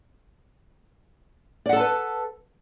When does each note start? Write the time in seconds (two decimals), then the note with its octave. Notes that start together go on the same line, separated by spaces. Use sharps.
1.66 D5
1.69 F#5
1.73 A4
1.76 A5
1.80 B4